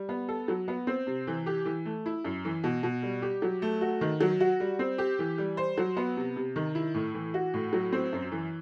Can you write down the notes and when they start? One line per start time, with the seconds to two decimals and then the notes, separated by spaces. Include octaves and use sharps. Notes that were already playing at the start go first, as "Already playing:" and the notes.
Already playing: G3
0.09 B3
0.28 A4
0.48 F#3
0.68 B3
0.87 C4
1.07 C3
1.27 E3
1.46 G4
1.65 E3
1.85 A3
2.06 E4
2.25 F#2
2.45 E3
2.64 B2
2.83 B2
3.03 G3
3.22 G4
3.42 F#3
3.62 A3
3.81 F#4
4.01 D#3
4.21 F#3
4.40 F#4
4.60 G3
4.79 C4
4.98 G4
5.19 E3
5.38 G3
5.57 C5
5.78 F#3
5.97 B3
6.17 C3
6.36 C3
6.56 D#3
6.75 E4
6.94 A2
7.14 E3
7.34 F#4
7.54 A2
7.73 F#3
7.93 C4
8.13 F#2
8.32 E3